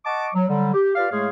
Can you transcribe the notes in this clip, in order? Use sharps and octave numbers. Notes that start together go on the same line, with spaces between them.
D#5 F#5 A5 C#6 D6
F#3
D3 F#3 G3
G4
F4 G4 B4 D5 F5
A2 G#3 A3 G#4 C#5 F5